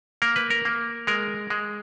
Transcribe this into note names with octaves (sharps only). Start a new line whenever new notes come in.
A#3 A#4
B4
A#4
A#3
G#3 A#4
G#3